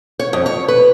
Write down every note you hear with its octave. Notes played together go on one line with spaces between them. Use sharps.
C#5
F2
C#5
B4